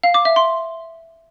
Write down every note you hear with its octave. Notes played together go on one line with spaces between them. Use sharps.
F5
D6
E5
C6